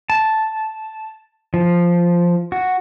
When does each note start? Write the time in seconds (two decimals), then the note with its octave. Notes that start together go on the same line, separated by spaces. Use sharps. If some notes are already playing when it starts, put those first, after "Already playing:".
0.10 A5
1.54 F3
2.52 F#4